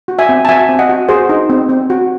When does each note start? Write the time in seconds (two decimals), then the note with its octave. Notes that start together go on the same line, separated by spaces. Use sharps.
0.08 F#4
0.19 E5 G#5
0.29 C4
0.45 A5
0.49 F#4 E5 G#5
0.69 C4
0.79 D#5 F#5
0.89 F#4
1.09 F#4 G#4 C5
1.29 D#4
1.50 C4
1.69 C4
1.90 F#4